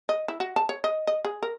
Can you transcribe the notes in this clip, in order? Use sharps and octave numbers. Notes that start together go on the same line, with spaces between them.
D#5
E4
F#4
A5
C#5
D#5
D#5
G#4
A#4